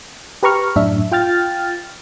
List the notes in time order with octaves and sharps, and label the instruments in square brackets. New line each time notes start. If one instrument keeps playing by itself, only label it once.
[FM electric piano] G4 B4 A#5 C#6 F6
F#2 A2 D4 E5
F4 G5 F6 A6